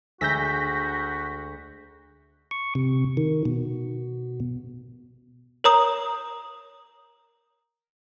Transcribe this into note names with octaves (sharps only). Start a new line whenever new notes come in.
D2 G#3 F#4 E6 G6 A#6 B6
C#6
C3
D#3
B2
A#4 C#5 A#5 D#6